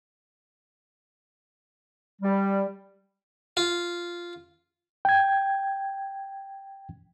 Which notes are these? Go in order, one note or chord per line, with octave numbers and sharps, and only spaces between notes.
G3
F4
G5 G#6